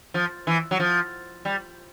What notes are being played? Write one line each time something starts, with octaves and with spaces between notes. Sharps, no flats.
F3
E3
F#3
F3
G3